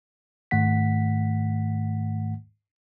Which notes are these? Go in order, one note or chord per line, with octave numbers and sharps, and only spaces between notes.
G#2 D#3 A3 F#5 B6